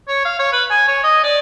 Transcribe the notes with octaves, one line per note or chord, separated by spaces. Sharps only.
C#5
F5
C#5
B4
G#5
C#5
D#5
D5